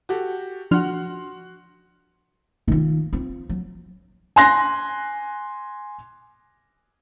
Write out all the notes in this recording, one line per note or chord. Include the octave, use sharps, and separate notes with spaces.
F#4 G4 A4
F3 D4 F#4 F#5 C6 F6
D#3 F4
C4 F4
F#3
G#5 C6 F#6 A#6